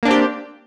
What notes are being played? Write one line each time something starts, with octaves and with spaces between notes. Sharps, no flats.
A#3 C4 D4 G4